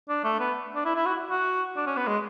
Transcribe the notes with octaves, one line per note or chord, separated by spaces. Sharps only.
D4
A3
B3
D4
E4
E4
F#4
F#4
D4
C#4
B3
G#3